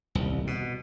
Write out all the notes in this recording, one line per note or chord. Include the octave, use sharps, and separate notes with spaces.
D#1 C2
B2